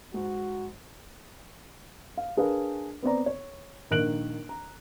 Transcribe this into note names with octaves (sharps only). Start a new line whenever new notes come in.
G#2 F#4
F5
D4 G#4 A#4 B4 F5
B3 C4 D5 A#5
C#5
A#1 D#3 A#3 F#6 D7 F#7
A#5